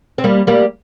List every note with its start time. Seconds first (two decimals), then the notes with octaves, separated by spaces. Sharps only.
0.18 C4
0.24 G3 A#3
0.47 G3 A#3